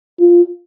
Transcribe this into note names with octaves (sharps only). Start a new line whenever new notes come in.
F4